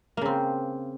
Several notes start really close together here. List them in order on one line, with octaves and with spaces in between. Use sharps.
A#3 C#3 C4